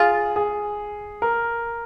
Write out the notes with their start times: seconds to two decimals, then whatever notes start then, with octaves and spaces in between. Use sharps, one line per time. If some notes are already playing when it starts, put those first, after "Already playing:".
Already playing: F4 G#4
0.36 G#4
1.22 A#4